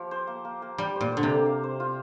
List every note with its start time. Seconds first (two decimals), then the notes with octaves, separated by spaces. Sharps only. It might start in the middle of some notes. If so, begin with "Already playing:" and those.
Already playing: F3 A#3 G4
0.11 C5
0.27 A#3
0.45 A#3
0.62 A#3
0.78 G3 G4
0.96 C5
1.01 A#2
1.12 D3 C5
1.23 C3
1.30 A#3
1.46 F5
1.63 C5
1.80 F4